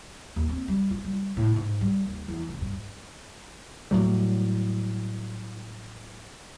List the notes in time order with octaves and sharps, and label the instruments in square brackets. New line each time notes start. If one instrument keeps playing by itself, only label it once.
[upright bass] D#2
C4
G3
F4
G3
A2
G#2
G3
D#2
E2
F1
G2
[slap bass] A2 F#3 G3